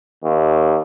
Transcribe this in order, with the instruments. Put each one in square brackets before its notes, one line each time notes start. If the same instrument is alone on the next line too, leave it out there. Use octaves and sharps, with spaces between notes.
[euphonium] D#2